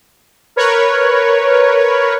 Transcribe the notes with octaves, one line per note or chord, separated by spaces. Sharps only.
A#4 B4 C#5